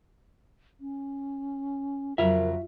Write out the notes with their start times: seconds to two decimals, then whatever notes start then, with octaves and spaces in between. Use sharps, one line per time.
0.81 C#4
2.18 F2 C#3 F#3 F4 A#4 E5